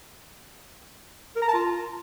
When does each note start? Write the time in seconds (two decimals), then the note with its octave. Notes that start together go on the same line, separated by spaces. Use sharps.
1.36 A#4
1.42 A#5
1.48 A5
1.54 F4